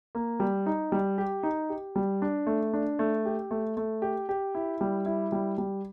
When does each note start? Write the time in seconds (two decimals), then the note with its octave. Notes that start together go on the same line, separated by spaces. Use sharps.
0.15 A#3
0.40 G3
0.66 D#4
0.92 G3
1.18 G4
1.43 D#4
1.70 G4
1.96 G3
2.22 D4
2.47 A3
2.73 D4
2.99 A3
3.25 G4
3.51 A3
3.77 A3
4.02 G4
4.29 G4
4.55 E4
4.81 G3
5.06 E4
5.32 G3
5.58 G3